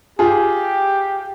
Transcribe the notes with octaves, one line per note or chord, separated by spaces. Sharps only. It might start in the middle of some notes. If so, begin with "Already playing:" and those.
F4 G4 G#4